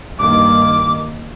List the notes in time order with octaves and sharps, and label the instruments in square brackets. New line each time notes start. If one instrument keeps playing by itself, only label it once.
[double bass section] G2 D#3 A#3 [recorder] D6